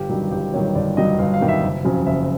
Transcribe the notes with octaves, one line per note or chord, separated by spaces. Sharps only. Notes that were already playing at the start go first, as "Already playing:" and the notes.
Already playing: G1 G4
G2 D#3 F#3
G1 G4
G2 D#3 F#3 C#5
G1 D5
G2 D#3 F#3 D#5
G1 F5
F5
G2 D#3 F#3
E5
F#1
F2 C#3 F#3
F#1 E5